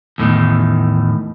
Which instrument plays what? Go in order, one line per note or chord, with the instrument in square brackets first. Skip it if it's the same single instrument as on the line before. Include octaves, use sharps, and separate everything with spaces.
[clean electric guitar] E2 A2 D3 D#3